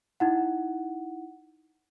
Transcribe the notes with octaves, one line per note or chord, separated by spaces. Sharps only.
D#4 E4 F#5